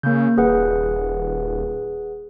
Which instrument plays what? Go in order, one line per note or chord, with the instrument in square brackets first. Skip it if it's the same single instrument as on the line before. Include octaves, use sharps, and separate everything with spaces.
[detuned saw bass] C#3 [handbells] A#3 G6
[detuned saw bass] D#1 [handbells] G#4 B4 F#5